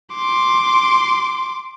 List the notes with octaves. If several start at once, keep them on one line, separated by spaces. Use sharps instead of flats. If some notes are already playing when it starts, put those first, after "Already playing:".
C6 D6